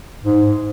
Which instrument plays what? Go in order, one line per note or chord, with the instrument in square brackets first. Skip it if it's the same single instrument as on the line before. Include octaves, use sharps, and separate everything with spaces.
[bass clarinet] G#2